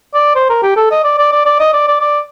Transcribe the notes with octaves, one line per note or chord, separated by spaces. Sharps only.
D5
C5
A#4
G4
A4
D#5
D5
D5
D5
D5
D#5
D5
D5
D5